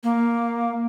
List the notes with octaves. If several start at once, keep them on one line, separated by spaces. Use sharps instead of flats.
A#3